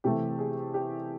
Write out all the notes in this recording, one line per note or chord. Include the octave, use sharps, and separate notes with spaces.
C3 E3 A3 G4
G#4
G4